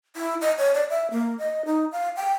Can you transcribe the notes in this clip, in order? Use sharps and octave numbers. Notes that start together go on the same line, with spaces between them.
E4
D#5
C#5
D5
E5
A#3
D#5
D#4
F5
G5